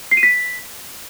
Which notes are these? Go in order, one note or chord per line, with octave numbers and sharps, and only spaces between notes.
C7
D#7
B6